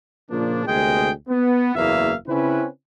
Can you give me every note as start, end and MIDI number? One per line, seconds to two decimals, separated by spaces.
0.31 0.65 46
0.31 0.65 49
0.31 0.65 53
0.31 0.65 58
0.31 0.65 62
0.66 1.11 38
0.66 1.11 48
0.66 1.11 56
0.66 1.11 58
0.66 1.11 68
0.66 1.11 79
1.28 1.74 59
1.75 2.14 30
1.75 2.14 40
1.75 2.14 58
1.75 2.14 64
1.75 2.14 76
1.75 2.14 77
2.28 2.66 49
2.28 2.66 60
2.28 2.66 61
2.28 2.66 64
2.28 2.66 71